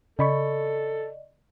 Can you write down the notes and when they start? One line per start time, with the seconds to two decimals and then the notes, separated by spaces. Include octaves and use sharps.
0.19 C#3 A4 D5 D#5 B5 C#6